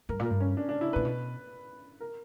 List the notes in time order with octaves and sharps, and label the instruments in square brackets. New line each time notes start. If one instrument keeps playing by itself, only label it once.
[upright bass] G2 [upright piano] A#4
[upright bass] A#2
[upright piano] A#4
[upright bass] G2
[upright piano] C#4
D4
D4
E4
[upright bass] A#2 [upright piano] B4
[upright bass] B2
[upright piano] A#4